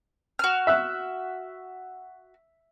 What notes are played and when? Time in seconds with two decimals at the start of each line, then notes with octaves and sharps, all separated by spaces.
0.39 F#4 F6
0.67 E5 F#6